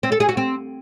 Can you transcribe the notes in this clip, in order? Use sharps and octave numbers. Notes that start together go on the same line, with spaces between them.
C4
A4
G#4
F#4
C4